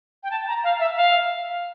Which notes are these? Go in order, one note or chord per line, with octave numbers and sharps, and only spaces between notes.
G5
A5
A#5
F5
E5
F5